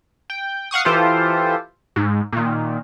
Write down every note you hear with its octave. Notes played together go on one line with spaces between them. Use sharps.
G5
F5 F#5 C#6 D#6
E3 F4 G4 A4 C5
G#2
A#2 D#3